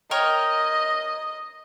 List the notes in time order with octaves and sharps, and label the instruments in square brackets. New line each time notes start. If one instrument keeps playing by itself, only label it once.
[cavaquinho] A#4 C#5 G5 [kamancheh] D#5